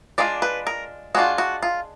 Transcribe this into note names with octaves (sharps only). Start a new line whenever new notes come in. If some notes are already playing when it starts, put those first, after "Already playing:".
G#3 D4 F4 D5
B4
A#4
G#3 D4 F4 F#4
F#4
F4